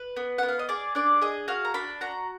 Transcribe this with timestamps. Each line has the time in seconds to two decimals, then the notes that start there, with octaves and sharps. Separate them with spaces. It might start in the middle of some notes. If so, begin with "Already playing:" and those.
Already playing: B4
0.16 B3
0.38 B3 F#5
0.48 F5
0.59 D#5
0.69 G#4 D5
0.95 D4 D5
1.21 G#4 D#5
1.48 F#4 F5
1.65 A#5
1.74 D4 B5
2.01 F#4 A#5